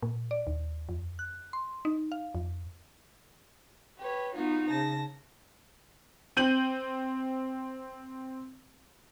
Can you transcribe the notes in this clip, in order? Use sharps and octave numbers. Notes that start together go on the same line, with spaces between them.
A#2
D5
D#2
F2
F#6
C6
D#4
F5
F2
G4 B4 C#5
B3 D#4 F4 F#4
C#3 A5 A#6
C4 G6 D#7 F#7